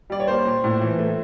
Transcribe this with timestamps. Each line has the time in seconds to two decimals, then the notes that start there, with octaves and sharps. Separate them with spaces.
0.10 G3 D5
0.20 C#5
0.27 A#3 C5
0.45 A#2
0.64 A2
0.81 E3
0.99 A3